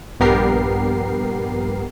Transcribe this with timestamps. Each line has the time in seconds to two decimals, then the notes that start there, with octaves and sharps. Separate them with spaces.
0.20 A#1 G2 B3 G4 A#4 C7